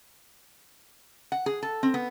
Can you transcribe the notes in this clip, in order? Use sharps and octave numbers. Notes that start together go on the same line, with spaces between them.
F#5
G#4
A4
C4
B3